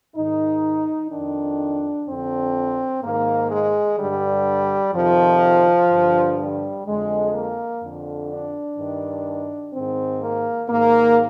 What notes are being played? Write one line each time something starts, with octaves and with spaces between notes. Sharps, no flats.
G#2 D#3 D#4
F2 D#3 D4
F2 D3 C4
G#2 D#3 A#3
G#3
G2 D3 G3
F2 C3 D#3 F3
G2 D3
G3
F2 D3 G#3
A#3
F2 D3
D4
G2 D#3
G#2 D#3 C4
A#3
G#2 D#3 A#3